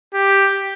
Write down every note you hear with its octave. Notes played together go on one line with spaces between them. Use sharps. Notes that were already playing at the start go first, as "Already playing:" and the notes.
G4